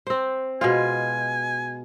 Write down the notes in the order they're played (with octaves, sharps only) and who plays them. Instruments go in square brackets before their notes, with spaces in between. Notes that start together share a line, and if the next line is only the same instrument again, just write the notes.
[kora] C4 C5
[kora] B2 G#3 F4 [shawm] G#5